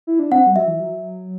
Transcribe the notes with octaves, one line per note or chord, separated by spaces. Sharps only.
E4
D4
C4 F#5
G3
F#3 E5
E3
F#3